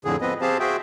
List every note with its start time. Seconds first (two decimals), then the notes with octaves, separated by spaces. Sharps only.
0.05 F2 A2 D3 G#4
0.21 F3 B3 C4 B4 D#5
0.41 C4 G4 G#4 C5 F5 A5
0.60 F#4 G#4 C5 E5 G5